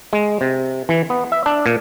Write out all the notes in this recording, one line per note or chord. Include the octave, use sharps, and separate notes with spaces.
G#3
C3
E3
B3
E5
D4
A#2